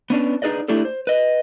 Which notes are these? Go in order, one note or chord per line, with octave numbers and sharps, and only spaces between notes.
B3 C#4 D4 B4
D4 D#4 G#4 B4 D5 D#5
A3 D4 E4 G4 A4
C5
B4 D#5